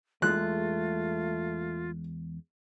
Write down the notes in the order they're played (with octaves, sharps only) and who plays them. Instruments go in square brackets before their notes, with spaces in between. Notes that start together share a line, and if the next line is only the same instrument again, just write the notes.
[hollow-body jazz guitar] E2 G#3 [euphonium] A3 [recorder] F4 [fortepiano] F#6